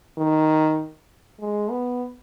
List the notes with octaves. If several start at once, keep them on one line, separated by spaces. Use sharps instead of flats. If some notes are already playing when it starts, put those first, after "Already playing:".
D#3
G#3
B3